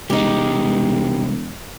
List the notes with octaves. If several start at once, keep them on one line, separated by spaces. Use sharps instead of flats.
E1 C2 G#3 D#4 G4